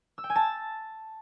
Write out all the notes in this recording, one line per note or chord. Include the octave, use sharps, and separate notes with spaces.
E6
G5
G#5
A5